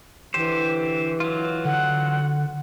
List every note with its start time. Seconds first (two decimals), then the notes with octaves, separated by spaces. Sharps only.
0.34 D3 E3 G4 C5
1.20 F#3 F4
1.65 D3 F#5